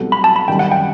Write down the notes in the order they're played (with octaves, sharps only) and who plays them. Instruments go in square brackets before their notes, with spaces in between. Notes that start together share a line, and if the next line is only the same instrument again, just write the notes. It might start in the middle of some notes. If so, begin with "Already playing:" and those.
Already playing: [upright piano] C2 B2 F#3 A3
[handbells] B5
A5
B5
[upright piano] F#2 D#3 G3 [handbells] G5
[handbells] F#5
G5